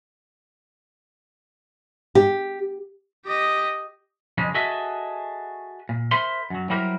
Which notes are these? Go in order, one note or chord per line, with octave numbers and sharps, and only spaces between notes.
G4
G4 D#5
F2 C#3 G3 G#3
F#4 G#4 A4 D#5 E5
A#2
A#4 C5 E5 B5 C6
F#2 F#3
F#3 G3 E4 G4 A#4 C5